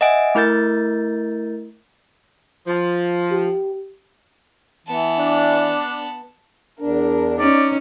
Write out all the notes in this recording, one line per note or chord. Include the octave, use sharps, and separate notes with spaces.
D#5 E5 F#5 G#5 D7
A3 E4 A#4 G6 A6
F3
G4
E3 B3 A5
D4
E2 D4 A#4
C#4 D#4 D5